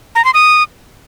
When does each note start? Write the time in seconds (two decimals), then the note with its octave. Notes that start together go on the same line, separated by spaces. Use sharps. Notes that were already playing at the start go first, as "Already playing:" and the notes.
0.15 A#5
0.25 C6
0.34 D#6